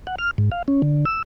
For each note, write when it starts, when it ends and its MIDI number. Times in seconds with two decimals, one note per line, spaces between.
0.07 0.15 78
0.18 0.31 89
0.38 0.50 44
0.52 0.62 77
0.68 0.82 61
0.82 1.05 50
1.05 1.23 88